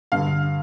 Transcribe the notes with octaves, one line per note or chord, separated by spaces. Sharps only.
G2 D3 F5